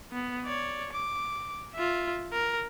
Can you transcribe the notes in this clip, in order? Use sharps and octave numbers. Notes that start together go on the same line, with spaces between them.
B3
C#5 D5
D6
F4 E5
A#4